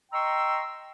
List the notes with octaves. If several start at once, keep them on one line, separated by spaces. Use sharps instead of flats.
D#5 G5 A#5 C6 C#6 E6